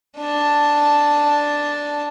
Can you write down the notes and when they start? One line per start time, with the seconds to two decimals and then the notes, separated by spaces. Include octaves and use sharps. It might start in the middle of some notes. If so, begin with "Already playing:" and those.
0.19 D4 A5